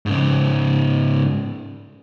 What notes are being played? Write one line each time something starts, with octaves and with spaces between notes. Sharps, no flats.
G#2 C#3